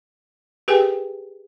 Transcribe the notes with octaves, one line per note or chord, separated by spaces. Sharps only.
G4 G#4 A#4 B4 G5 G#5